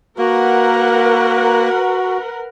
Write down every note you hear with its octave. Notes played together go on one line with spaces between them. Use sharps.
A#3 F#4 A#4 B4 F#5